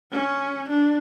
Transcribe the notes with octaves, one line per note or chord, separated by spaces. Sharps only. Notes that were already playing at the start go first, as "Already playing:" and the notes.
C#4
D4